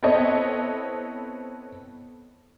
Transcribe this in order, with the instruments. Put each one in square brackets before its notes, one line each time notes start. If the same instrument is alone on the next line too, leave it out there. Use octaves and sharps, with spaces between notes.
[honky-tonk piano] B3 C4 E4 A4 C#5 D#5